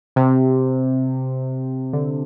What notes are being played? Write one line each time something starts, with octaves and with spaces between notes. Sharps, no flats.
C3
D3